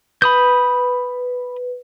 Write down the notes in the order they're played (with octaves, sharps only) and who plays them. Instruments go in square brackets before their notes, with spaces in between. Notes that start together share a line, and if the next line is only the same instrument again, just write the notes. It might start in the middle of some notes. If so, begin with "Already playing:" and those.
[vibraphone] B4 [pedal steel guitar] B5 D#6 G6